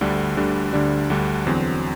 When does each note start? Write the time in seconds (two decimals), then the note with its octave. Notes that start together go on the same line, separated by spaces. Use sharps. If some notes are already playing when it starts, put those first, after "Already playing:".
0.01 D2 D3 G3 D4
0.37 D2 D3 G3 D4
0.73 D2 D3 G3 D4
1.10 D2 D3 G3 D4
1.46 E2 D3 F#3 C4